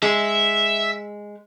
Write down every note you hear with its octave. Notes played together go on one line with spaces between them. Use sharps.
G#3 E5